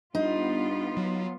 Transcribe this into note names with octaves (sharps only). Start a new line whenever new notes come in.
G2 B3 D#4 F4
F#3